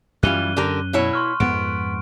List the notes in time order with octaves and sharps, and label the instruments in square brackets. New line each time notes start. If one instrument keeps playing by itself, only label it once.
[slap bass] F#2 C#4 [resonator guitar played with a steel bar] E3 G3 F4 [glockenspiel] F#6 D#7 G7
[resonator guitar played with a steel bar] D3 G4 A#4
B2 E4 C#5
[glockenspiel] C6 C#6 F6
[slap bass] F2 G#2 [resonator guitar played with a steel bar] B3 [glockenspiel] D7